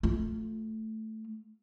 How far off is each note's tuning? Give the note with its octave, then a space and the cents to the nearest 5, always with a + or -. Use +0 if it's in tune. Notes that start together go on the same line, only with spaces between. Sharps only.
A3 +0 F4 +0